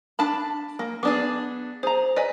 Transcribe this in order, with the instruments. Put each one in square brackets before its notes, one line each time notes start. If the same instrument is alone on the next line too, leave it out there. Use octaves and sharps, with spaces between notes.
[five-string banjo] D4 A5 B5
A#3
[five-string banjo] B3 D4 G#4 [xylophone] D6
[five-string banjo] G#4 A#5 [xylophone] C5
[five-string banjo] B4 [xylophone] D5 D#5 G#5